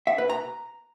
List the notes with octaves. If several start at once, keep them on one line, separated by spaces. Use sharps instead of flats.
E5
B4
A#5